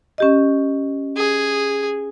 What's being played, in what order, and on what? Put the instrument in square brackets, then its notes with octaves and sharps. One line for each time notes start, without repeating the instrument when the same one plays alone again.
[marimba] C#4 G4 D#5
[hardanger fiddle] G#4